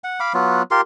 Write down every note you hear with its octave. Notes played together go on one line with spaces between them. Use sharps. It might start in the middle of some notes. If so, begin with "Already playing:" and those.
F#5
F5 B5 D6
F#3 B3 F4
F4 G4 A#4 C6